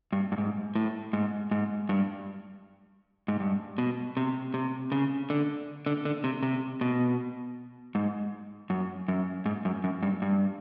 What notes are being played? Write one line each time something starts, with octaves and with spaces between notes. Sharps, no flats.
G2
G2
G#2
A2
G#2
G#2
G2
G#2
G2
B2
C3
C3
C#3
D3
D3
D3
C3
C3
B2
G#2
F#2
F#2
G#2
F#2
F#2
G2
G2